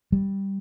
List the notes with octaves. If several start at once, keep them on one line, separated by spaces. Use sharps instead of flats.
G3